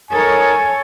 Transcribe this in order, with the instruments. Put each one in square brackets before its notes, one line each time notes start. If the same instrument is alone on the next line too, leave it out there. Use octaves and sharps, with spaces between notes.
[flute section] D#4 A#4 D#6 [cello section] A4 C#5 [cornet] G#5